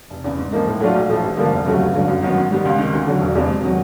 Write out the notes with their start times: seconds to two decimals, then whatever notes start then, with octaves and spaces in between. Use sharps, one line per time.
0.10 F1
0.24 E2 C#3
0.38 G#2
0.52 F3 A#3 D#4
0.67 A2
0.80 F#3 A3 D4 F4
0.94 B1
1.09 A2 F3 A3
1.23 A1
1.37 G2 D3 F3 A#3
1.52 F1
1.66 D#2 C#3 F#3 A3
1.80 G1
1.94 G2 D3 F#3
2.08 F#2
2.22 D#3 F#3 B3
2.37 G#2
2.51 D#3 G3 B3
2.65 C#2
2.79 C3 D#3
2.93 D2
3.07 D3 F#3
3.21 E1
3.35 E2 C3 F3 G#3
3.50 E1
3.64 C3 D#3 F#3